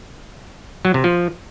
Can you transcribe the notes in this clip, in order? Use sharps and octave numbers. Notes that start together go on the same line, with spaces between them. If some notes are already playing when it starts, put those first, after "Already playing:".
F#3
C3
F3